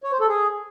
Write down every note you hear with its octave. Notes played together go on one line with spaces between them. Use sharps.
C#5
C5
A4
G#4